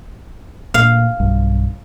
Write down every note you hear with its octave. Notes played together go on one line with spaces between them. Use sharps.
A#2 F5
B1 G2